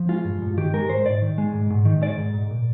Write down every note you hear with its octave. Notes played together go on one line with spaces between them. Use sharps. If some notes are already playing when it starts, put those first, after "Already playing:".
Already playing: F3
G#3 F4
G2
G2
D#3 G4
G#3 A#4
G#2 C5
G#2 D5
D#3
G#3
G#2
G#2
D#3
G#3 D5
G#2
G#2
A#2